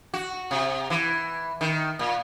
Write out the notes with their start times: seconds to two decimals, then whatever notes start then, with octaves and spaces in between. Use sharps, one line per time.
0.14 F#4
0.51 C3
0.90 E3
1.61 D#3
1.99 A#2